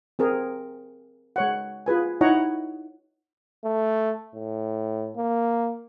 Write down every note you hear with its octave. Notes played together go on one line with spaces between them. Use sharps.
C4 G#4 A#4
G#3 C#5 F#5
F4 G#4 B4 G#5
D#4 E4 C#5 D#5 F#5 A#5
A3
A2
A#3